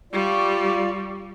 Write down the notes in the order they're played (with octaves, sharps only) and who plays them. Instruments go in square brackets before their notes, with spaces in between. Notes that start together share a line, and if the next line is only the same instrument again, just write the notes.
[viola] G3 [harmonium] F4 D5 [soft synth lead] C#6